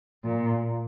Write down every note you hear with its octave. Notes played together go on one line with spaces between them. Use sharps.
A#2